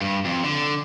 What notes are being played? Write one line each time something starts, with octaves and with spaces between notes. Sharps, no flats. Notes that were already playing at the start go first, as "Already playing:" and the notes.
G2
F2
D3